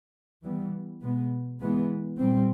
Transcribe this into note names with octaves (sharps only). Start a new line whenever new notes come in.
E3 G3 B3
B2 G#3 B3
E3 G#3 B3
A#2 G3 C4